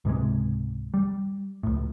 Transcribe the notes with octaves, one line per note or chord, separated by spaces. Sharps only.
C#2 G#2 C3 G#3
G3
C#2 A2